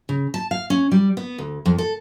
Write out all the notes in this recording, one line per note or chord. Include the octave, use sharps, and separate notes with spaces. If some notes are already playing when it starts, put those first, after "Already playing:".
C#3
A5
F5
C#4
G3
B3
D2
F2
A4